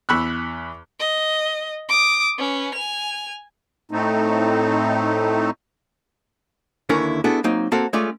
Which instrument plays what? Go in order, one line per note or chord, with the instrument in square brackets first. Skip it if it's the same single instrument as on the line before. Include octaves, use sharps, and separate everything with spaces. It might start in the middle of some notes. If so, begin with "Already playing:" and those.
[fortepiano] E2 B5 C#6 E6 F#6
[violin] D#5
D6 D#6
C#4 B4
G#5 F7
[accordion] A2 A3 C4 D#4
[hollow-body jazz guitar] D#2 D3 C#4 E4 A#4 B4
B3 D4 E4 F#4 G#4 A4
F#3 A#3 C4 D#4
A#3 C4 F#4 A4 F5
G#3 A3 C#4 F4 D5